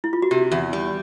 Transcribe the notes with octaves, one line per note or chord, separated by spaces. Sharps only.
E4
F4
F#4
C3 G4
E2
G3